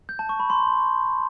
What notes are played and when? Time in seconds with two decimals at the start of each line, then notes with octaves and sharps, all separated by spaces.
0.09 G6
0.19 A5
0.29 C#6
0.40 B5
0.50 C6